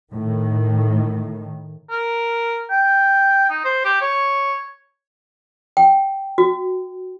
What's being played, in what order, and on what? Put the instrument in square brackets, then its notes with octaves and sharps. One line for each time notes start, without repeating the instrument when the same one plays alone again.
[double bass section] A2 D#3
[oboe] A#4
G5
D#4
C5
G4
C#5
[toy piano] G5
F#4